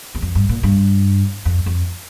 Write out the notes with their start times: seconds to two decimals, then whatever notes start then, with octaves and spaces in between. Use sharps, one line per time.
0.15 E2
0.22 F2
0.35 G2
0.49 A#2
0.63 G2
1.45 F2
1.66 F2